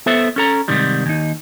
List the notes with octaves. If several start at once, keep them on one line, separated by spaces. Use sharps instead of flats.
B3 A4 C5 E5
C#4 A4 A#5
G#2 C3 D#3 G3
D#2 D#4